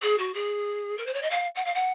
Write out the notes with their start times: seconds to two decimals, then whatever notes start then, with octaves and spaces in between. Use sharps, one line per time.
0.02 G#4
0.18 F#4
0.33 G#4
0.97 A#4
1.05 C5
1.13 C#5
1.22 D#5
1.30 F5
1.55 F#5
1.64 F5
1.74 F#5